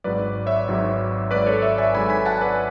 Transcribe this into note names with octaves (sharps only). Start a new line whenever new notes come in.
G#1 G#2 F#3 B4 D5
C#5 E5
G#1 G#2 F#3
G#1 G#2 F#3 B4 D5
A4 C#5
C#5 E5
E5 G#5
G#1 G#2 F#3 G#5 B5
G#5 B5
F#5 A5
B4 D5